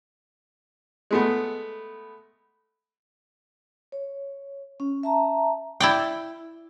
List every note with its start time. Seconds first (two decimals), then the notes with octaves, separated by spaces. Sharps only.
1.11 G#3 A3 B3
3.92 C#5
4.80 C#4
5.03 E5 A5 A#5
5.80 E4 D5 G5